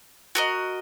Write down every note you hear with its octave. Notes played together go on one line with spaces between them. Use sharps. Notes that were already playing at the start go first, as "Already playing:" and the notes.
F#4 A#4 D#5